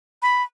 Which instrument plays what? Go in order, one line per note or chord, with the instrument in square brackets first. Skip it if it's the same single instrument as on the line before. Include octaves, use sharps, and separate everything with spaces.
[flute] B5